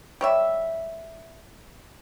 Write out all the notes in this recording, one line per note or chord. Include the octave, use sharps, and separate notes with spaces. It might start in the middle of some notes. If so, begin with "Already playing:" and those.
G3 C#5 E5